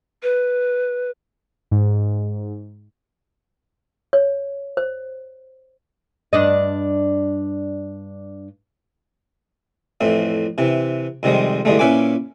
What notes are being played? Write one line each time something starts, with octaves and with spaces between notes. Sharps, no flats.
B4
G#2
C#5
C5
G2 D4 D#5
F2 A2 E3
C3 E3
F2 C3 D#3 G3 G#3
E2 G2 D3 G#3 A3
A#2 C#4 E4 B4 G#5 D6